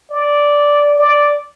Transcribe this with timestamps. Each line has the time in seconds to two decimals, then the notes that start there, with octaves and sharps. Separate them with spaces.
0.11 D5
0.98 D5